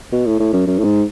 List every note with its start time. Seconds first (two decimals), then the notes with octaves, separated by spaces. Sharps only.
0.12 B2
0.26 A2
0.39 A2
0.53 F#2
0.67 F#2
0.79 A2
0.84 G#2